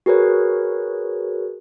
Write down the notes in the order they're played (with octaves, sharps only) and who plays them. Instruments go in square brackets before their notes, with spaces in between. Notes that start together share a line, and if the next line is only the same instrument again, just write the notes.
[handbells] F#4 G#4 A#4 B4 C#5